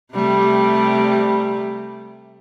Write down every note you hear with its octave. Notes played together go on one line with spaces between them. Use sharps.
C3 G3 A3